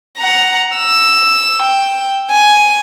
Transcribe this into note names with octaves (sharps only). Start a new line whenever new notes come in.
F#5 A#5
E6
G5
G#5